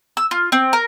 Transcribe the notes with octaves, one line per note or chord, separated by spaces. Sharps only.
E6
F4
C4
A#4